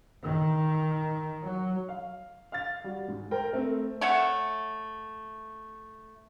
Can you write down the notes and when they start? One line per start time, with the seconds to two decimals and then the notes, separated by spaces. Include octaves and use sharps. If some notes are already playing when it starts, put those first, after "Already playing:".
0.24 D#3
1.44 F#3
1.89 F5
2.52 F5 F6 A6
2.84 G3 F#4
3.08 G#2
3.31 A#4 C5 G5
3.53 A3 C4 A#4
4.01 A3 C#5 E5 F#5